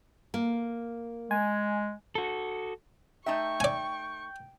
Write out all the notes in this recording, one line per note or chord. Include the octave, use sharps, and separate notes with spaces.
A#3
G#3 G#5
F#4 A4
A3 D#4 E5 G5 C#6
D5 G#5